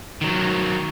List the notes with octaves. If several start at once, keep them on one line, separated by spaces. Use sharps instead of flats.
D#3 F#3